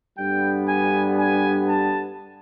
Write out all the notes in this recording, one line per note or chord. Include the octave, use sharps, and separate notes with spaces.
G2 D3 G3 B3 G5
G#5
G#5
A5